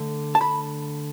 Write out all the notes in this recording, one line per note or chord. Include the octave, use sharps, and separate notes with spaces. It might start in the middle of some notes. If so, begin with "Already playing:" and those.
Already playing: D3 A3
A5
B5